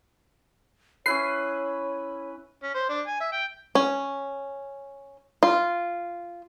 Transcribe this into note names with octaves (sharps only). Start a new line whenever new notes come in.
C#4 E4 B4 C#5 C7
C#4
C5
D4
G#5
E5
G5
C#4
F4